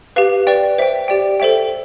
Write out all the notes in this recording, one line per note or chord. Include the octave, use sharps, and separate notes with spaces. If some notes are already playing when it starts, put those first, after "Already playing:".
G4 B4 F5
B4 D5 G5
C5 E5 G5
G4 D5 G5
A4 C5 E5 G5